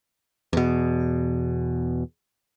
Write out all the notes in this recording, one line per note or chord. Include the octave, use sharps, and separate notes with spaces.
E2 B2